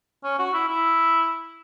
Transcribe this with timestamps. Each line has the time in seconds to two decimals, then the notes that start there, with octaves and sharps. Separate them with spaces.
0.24 C#4
0.39 F#4
0.54 E4
0.69 E4